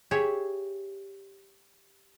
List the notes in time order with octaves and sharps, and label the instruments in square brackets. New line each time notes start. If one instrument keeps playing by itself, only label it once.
[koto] G4 G#4 C#5 E5